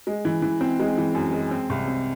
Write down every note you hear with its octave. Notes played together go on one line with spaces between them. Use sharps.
G#3
E3
E3
C4
G#3
E3
F#2
G#3
C4
C2
C4